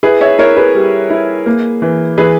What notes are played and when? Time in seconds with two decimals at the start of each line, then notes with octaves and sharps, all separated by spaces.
0.03 E4 G#4 B4
0.21 C#5 E5
0.39 E4 A#4 C#5
0.57 G#4 B4
0.75 G3
1.10 E4
1.46 A#3
1.82 E3
2.18 E3 G#4 B4